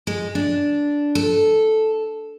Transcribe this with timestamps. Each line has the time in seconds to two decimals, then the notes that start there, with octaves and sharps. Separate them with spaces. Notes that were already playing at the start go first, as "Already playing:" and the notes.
0.07 G#3
0.35 D4
1.15 A4